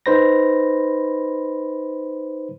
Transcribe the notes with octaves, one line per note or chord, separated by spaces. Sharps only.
D#4 B4 C5 B5 A#6